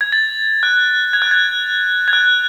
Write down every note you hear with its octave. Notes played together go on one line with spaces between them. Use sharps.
G#6
A6
F#6
G#6
F#6
G#6
G#6
F#6